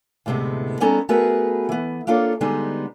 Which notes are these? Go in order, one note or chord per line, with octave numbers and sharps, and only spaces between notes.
D2 A2 C3 G#3 B3
G3 B3 C#4 D#4 A4 A#5
A3 B3 F#4 G#4 A#4 B4
E3 B3
A#3 D4 F4 A4 C#5
D3 G3 G#3 B3 D#4